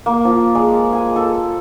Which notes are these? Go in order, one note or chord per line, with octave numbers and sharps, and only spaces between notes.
A#3
F3
G#3
G#5
A4